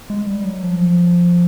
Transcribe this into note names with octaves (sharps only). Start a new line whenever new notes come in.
G#3
G3
F#3
F3